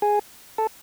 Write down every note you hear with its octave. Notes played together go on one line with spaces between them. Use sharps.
G#4
A4